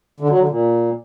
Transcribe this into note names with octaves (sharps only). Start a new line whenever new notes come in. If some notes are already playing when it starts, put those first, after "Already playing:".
D3
F#3
D3
A#2